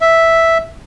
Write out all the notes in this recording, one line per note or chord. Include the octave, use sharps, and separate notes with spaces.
E5